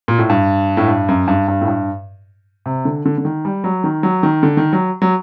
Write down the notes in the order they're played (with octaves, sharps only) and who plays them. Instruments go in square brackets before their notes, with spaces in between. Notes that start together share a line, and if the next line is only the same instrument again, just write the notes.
[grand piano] A#2
A2
G2
A2
G2
F#2
G2
G2
A2
G2
C3
D3
D3
D3
D#3
G3
F#3
D#3
F#3
D#3
D3
D#3
F#3
F#3